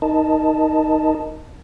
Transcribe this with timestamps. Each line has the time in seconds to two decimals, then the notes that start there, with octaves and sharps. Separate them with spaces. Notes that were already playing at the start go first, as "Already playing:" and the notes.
0.02 D#4 A#4 D#5 A5